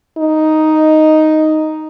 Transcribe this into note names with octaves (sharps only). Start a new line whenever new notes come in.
D#4